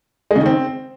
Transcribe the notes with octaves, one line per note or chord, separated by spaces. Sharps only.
G#3
C#3
D#3
C4